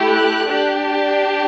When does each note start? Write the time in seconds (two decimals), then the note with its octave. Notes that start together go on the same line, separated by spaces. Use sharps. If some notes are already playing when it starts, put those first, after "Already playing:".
Already playing: A3 E4 G4
0.09 F#6
0.46 D4 G4